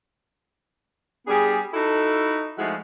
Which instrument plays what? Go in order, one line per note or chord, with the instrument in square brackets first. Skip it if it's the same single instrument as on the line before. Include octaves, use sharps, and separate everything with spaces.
[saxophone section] G3 B3 D4 G#4
D#4 E4 F#4 A4
F3 G#3 A3 D#4 E4 F#4